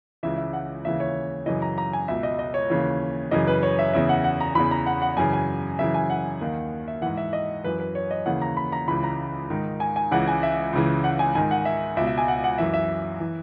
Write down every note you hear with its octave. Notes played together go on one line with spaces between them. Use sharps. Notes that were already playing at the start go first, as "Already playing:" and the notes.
C#2 C#3 E3 E5
E5
F#5
D#2 C#3 E3 E5
C#5
F#2 C#3 E3 D#5
A#5
A#5
G#5
C#2 B2 E5
D#5
D#5
C#5
D#2 C#3 E3
F#2 C#3 E3 D#5
B4
C#5
E5
E2 C#3 E3 E5
F#5
F#5
A#5
E2 C#3 E3 B5
A#5
F#5
F#5
F#2 C#3 E3 G#5
G#5
F#2 C#3 E3 E5
G#5
F#5
D#2 D#3
E5
G#2 E3 F#5
E5
D#5
F#2 E3 B4
B4
C#5
D#5
D#2 C#3 E3 F#5
A#5
B5
A#5
C#2 C#3 E3 B5
A#5
G#2 D#3
G#5
G#5
C#2 C#3 E3 F#5
G#5
E5
C#2 C#3 E3
F#5
G#5
G#2 D#3 G#5
F#5
E5
C#2 B2 E5
E5
G#5
F#5
F#5
F#2 E3 E5
E5
E3